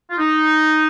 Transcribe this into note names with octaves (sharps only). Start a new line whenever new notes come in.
F4
D#4